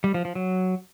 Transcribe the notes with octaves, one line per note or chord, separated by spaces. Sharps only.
G3
F3
F3
F#3